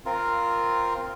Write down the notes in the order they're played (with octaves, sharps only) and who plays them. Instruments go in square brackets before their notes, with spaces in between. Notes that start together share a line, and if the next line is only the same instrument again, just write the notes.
[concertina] C4 F4 A#4